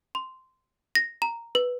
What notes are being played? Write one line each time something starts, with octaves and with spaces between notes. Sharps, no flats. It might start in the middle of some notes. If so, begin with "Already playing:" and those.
C6
A#6
A#5
B4